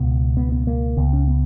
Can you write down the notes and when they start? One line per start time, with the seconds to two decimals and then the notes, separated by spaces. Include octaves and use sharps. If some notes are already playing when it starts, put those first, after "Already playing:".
Already playing: C#2 B2 B3
0.37 B3
0.52 B3
0.67 A#3
0.97 C#2 C#3 B3
1.13 C#4
1.28 B3